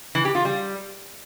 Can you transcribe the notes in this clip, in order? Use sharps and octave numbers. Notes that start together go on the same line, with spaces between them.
E3
G4
F4
G3